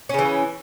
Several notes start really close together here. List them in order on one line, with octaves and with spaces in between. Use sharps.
C#4 C#3 E3